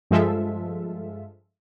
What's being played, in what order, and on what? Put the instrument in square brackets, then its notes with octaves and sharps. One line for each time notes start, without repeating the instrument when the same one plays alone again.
[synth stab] G2 F3 G#3 F4 A4 E5